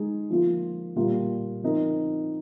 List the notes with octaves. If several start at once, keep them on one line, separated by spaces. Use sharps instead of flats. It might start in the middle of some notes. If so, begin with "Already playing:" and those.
Already playing: G#3 D#4 G#4
F3 A#3 F4
A#2 G3 A#3 F4
F3 C4 D#4 A#4